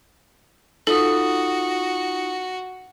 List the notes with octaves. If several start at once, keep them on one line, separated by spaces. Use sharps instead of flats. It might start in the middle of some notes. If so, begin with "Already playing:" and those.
D#4 F4 F#4 A4 D#6